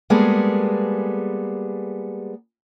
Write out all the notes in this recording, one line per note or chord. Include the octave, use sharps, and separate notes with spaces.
G3 G#3 A#3 B3 G#4 A4